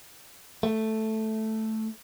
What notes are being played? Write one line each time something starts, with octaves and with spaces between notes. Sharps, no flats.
A3